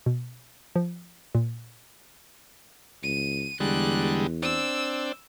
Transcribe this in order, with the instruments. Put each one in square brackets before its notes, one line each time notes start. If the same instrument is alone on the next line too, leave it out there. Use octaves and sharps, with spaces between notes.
[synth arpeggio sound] B2
F3
A#2
[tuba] C#2 [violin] D#7
[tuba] E2 [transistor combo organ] D3 G3 G#3 [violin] F#6
[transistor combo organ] C4 D4 [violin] E6